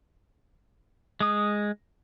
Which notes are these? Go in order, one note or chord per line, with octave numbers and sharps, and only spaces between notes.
G#3 D#6